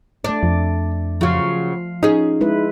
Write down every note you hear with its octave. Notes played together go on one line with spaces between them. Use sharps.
A3 D4 D5
F2
C#3 F3 F#3 F4 F5
C#4 D#4 G#4
G#3 E4 B4